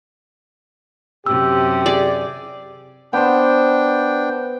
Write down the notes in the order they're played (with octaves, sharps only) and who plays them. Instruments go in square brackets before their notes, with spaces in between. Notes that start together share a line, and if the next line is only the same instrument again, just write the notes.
[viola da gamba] F#2 C3 [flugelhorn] G4 [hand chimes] E6
[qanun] G#4 D5
[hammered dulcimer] B3 C5 [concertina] D4 G5